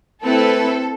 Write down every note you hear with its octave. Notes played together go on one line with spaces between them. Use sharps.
A3 C4 E4 A4 B4